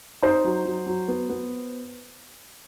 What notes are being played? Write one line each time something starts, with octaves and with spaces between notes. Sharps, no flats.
D#4 C5
F#3
F#3
F#3
B3
B3